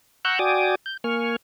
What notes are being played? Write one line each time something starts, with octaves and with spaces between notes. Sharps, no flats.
F#5 A#5 C#6 E6 F#6 G6
F#4 D5 G5 G#5 D6 D#6
G6
A#3 G#5 C#6 F6